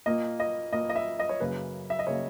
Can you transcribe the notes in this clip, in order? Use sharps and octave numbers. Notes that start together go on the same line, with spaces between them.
A#2 A#3 D#5
D#5
A#2 A#3 D#5
D#5
E5
D#5
C#5
F#2 C#3 F#3 A#3 B4
E5
D#5
C#3 F#3 A#3 C#5